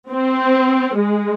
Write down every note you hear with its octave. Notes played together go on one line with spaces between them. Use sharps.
C4
G#3